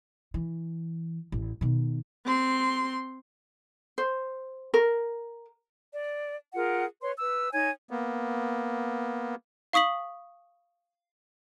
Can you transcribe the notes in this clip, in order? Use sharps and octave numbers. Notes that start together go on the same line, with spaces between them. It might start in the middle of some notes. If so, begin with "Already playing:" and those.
E3
A1
B2 D#3
C4 C6
C5
A#4
D5
F4 G#4 A#4 F#5
B4 C#5 C6
B4 E6
D#4 C#5 G#5 G#6
A#3 B3
F5 C#6 D#6 B6 F#7